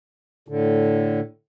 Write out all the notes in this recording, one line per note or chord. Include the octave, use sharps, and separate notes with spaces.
A2 D3